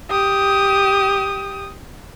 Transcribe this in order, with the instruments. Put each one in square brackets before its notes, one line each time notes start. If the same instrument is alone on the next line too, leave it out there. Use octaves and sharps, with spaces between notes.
[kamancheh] G4 D#6